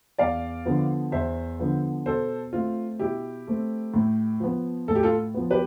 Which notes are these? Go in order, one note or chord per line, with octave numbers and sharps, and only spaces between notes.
E2 D5 F5
D3 F3 B3
E2 C5 E5
D3 F3 B3
B2 A4 C5
A3 C4 F4
B2 E4 G4
A3 C4
A2
F3 B3
A2 A4
G4
F4 A4
F3 B3
G4 B4